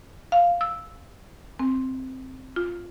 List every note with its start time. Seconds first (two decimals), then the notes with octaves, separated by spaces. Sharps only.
0.32 F5
0.61 E6
1.59 C4
2.56 F4